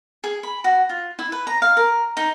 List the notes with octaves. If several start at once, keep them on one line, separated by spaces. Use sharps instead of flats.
G#4
B5
F#4
F4
E4
B4
A#5
F5
A#4
D#4